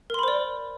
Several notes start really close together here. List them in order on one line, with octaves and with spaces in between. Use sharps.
A#4 C6 B5 C5 D5